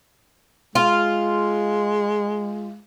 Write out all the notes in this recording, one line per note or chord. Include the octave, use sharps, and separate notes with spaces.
G#3 F4